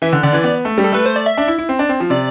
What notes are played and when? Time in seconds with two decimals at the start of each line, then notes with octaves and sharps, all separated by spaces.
0.02 E3 E5
0.13 D3
0.23 D3 D5
0.33 E3
0.44 B3
0.65 A3
0.78 G3
0.84 A4
0.92 A3 B4
1.06 C5
1.16 D5
1.26 E5
1.38 D4
1.48 E4
1.58 E4
1.69 C4
1.79 D4
1.89 C4
2.00 F3
2.10 C3 D5